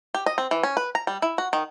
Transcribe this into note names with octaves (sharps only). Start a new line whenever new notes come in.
G4
D#5
C4
E3
C#4
B4
A#5
G3
E4
F#4
D#3